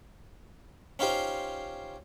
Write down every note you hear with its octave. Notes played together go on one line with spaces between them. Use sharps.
C#4 D#4 F4 G4 C5